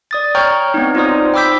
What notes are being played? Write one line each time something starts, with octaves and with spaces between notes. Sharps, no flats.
D5 D#6 A6
C#5 G5 A#5 C#6 F6 G6
B3 C4 D#4
D#4 F4 C5 D5 D#6
G5 B5 D6 E6 G6 B6